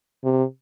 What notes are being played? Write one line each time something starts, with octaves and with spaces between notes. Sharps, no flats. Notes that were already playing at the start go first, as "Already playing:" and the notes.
C3